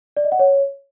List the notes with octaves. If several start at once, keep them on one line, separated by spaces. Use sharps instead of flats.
D5
D#5
F#5
C#5